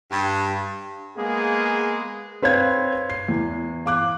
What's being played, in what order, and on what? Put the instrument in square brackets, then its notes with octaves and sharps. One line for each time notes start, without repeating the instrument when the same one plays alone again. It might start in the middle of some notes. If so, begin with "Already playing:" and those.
[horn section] G2
[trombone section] G#3 A#3 B3 G#4
[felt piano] C4 B4 C#5 F5 G#6
C7
E2
F5 D6 F#6